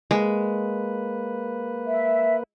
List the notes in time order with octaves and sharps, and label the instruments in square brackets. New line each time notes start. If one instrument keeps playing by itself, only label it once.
[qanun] G#3 [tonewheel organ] A#3 B4
[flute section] E5